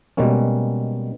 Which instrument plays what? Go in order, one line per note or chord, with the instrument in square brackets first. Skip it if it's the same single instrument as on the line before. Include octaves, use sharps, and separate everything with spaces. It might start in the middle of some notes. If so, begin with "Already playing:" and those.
[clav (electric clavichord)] B2 G3 G#3 A#3 C#4